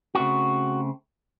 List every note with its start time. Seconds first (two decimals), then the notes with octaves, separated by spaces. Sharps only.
0.15 C#3 A3 C4 F#4